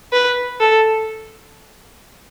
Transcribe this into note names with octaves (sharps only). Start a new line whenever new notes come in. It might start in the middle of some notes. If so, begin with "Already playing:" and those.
B4
A4